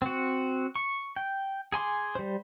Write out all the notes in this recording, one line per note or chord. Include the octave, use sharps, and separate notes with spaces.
C4 F#4
C#6
G5
G#4 G#5 C6 D6
G3 C5